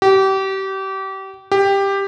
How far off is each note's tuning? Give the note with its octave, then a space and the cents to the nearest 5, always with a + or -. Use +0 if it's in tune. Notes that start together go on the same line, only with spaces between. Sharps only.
G4 -30
G4 +10